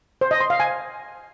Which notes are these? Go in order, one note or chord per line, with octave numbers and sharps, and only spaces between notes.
C5
D#5
C6
F5
G#5